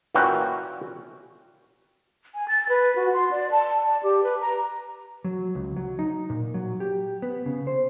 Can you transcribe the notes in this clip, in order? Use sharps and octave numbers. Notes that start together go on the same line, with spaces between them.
A#2 E3 C#4 F#4 G5
G#5
A6
B4
F#4
C6
D5
A5
D5
G4
B4
A#5
F#3
C#2
F#3
D#4
A#2
F#3
G4
B3
C#3
C5